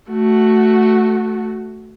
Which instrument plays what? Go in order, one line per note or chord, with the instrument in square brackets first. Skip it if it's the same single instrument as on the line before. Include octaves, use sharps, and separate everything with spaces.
[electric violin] A3 F#4